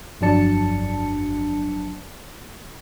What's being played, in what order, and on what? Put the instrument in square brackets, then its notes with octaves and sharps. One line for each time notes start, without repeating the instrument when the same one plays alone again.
[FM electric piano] G1 F2 F#3 D4 A5 C#7